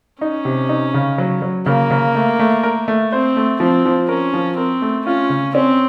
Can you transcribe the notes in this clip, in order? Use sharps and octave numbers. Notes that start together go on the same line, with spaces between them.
C#4 D#4
C3
D#4
C#3
F#3
F#3
C#3 A#3
C#3
A3
A3
A#4
A3
C4 C5
A3
F3 C4
F3
C#4 A#4
F3
C4 A#4
A3
C#4 F4
C#3
C4 C#4